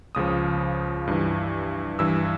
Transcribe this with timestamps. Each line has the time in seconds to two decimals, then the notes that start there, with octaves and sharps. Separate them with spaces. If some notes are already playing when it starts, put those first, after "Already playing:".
0.15 C#2 C#3 F3 D#6
1.07 G2 E3
1.99 G2 E3 E6